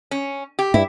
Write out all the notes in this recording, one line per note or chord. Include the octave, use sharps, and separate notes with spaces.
C#4
G4
G2 E4